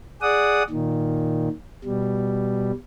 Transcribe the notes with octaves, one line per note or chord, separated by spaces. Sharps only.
G#4 D5 F#5 D#6
A#2 D#3
B2 G3